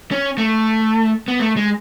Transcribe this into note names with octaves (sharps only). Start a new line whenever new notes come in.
C#4
A3
B3
A3
G#3